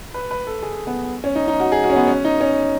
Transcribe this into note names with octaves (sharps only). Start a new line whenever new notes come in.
B4
B4
A4
G#4
B3
C#4
D#4
D#4
F#4
G#4
F#4
C#4
B3
C#4
D#4
C#4